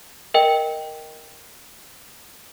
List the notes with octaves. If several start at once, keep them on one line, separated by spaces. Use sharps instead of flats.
A#4 D#5 G5